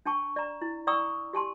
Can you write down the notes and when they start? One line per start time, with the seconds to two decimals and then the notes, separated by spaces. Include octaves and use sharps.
0.06 D4 G5 A5 C#6
0.36 D5 A#5
0.62 E4
0.87 D5 G5 A#5 C#6 D#6 E6
1.33 G4 G#5 A5 C6